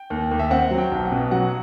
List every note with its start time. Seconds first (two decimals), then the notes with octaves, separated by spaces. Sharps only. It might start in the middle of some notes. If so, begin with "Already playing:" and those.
Already playing: G5
0.10 D#2
0.31 D#2
0.39 E5
0.50 C4 F#5
0.71 F#3
0.78 G5
0.92 B1
1.05 F#5
1.12 B2
1.31 F#3 F#5